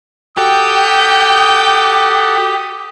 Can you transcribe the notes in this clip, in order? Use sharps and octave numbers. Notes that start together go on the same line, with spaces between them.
F#4 G4 A4 G5 D#6 G6